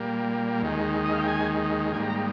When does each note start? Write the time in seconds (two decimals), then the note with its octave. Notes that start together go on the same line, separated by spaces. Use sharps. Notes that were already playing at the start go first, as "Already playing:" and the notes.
Already playing: A#2 G3 A#3
0.62 D#2 D#3 G#3
1.05 D#5
1.13 F5
1.20 G5
1.28 G#5
1.92 G#2 D#3 G3 A#3 G#5
2.10 A#5